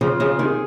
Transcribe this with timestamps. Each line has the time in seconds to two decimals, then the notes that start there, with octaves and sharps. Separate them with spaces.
0.01 C#3 F3 F4
0.20 C#3 F3 G#4
0.39 C3 D#3 G#4